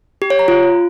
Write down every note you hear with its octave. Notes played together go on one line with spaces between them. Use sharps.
G4
C#5
A#5
F4